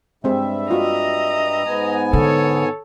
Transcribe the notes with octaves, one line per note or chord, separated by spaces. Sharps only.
G2 G3 G#3 C4 G#4 E5
F4 F#4 D#5 A#5
G#2 B3 G#5
D3 A4 C#5